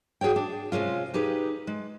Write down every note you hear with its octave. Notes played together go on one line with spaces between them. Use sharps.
F#4 G#4 A4 C#5 G5
D4
C3 G#3 C#4 F4
D#4 G4 G#4 B4
G#3